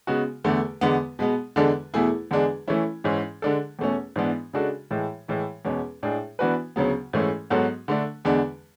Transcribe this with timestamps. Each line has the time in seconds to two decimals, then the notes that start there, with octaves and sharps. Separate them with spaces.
0.07 C#3 G#3 B3 F#4
0.44 E2 D3 A3
0.81 E2 D3 G#3 B3
1.19 B2 G#3 B3
1.56 E2 D3 G#3 D4 A4
1.94 E2 B2 A3 E4 G#4
2.31 E2 D3 G#3 D4 G#4
2.68 E3 A3 C#4 E4
3.04 G#2 E3 G#3 C#4
3.42 D3 G#3 D4 A4
3.79 E2 B2 A3 C#4
4.16 G#2 E3 B3 D4
4.53 C#3 G#3 D4 F#4 A4
4.91 A2 E3 G#3
5.28 A2 E3 G#3
5.65 E2 B2 G#3 C#4
6.03 A2 G#3 D4 G#4
6.39 E3 B3 D4 F#4 B4
6.76 D2 C#3 F#3 B3
7.13 G#2 E3 A3 C#4 G#4
7.50 G#2 F#3 B3 F#4 A4
7.88 D3 A3 D4
8.25 E2 D3 G#3 D4